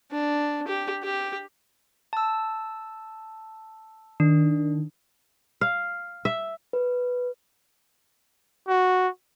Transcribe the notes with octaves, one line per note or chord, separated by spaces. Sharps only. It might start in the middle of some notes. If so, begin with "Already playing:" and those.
D4
G4
G4
A5 E6
D#3 D4
F5
E5
B4
F#4